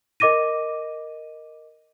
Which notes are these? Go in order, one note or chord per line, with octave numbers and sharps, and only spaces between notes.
A#4 D#5 D6 A#6 D#7